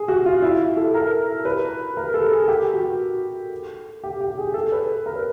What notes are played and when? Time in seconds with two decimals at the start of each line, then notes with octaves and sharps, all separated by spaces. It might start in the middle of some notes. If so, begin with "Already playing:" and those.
Already playing: G#4
0.08 F#4
0.26 F4
0.42 E4
0.77 A4
0.94 A#4
1.45 B4
1.97 A#4
2.14 A4
2.32 G#4
2.48 G4
2.74 F#4
4.03 G4
4.21 G4
4.38 G#4
4.54 A4
4.72 B4
5.06 A#4
5.15 B4